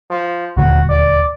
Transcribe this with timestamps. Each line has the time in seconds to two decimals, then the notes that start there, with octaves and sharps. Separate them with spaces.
0.10 F3
0.57 D#1 D2 F#4
0.89 D5